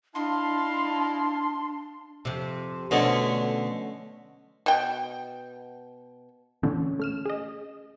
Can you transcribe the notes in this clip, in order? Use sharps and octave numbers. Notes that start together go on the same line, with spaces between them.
D4 E4 D#5 F5 A5 C6
F2 C3
B2 D3 A3 C#4 C5
B2 G5
A#2 D3 E3 C4 C#4
A3 F6 E7
G#4 D#5